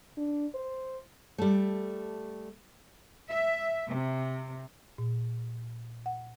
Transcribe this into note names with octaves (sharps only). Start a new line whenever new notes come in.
D4
C5
G3 A3
E5
C3
A#2
F#5